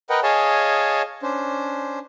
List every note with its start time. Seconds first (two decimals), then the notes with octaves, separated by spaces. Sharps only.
0.10 A#4 B4 D#5 F#5 G5
0.23 G#4 C#5 D#5 F5 G#5 A5
1.22 C#4 D4 C5